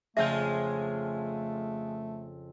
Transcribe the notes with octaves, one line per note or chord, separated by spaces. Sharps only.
F2 C#3 G#3 A3 F4 G#4 E5 G6